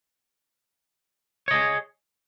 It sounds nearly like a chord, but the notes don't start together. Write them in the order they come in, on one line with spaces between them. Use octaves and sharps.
C#5 D#5 G#4